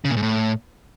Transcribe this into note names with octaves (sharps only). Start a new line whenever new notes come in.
C#3
A#2
G#2
A2